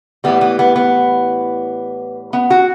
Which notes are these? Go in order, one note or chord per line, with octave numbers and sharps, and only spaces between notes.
A2 E3 G3 B3
B3
B3
B3
B3
F#4